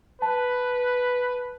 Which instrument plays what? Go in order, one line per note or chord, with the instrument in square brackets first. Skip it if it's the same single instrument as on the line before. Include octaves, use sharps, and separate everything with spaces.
[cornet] B4 [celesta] A5